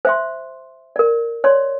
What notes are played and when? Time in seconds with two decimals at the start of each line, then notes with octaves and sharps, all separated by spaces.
0.05 C5 E5 C6
0.96 A#4 D5
1.44 C#5 D5 C6